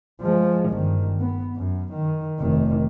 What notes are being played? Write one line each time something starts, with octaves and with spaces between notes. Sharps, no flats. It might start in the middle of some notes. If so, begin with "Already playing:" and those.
F3 G#3
G1 D#3
B3
F#2
D#3
F1 D#3